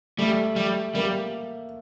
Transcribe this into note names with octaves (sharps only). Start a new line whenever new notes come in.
G3 A3
G3
G3 A#3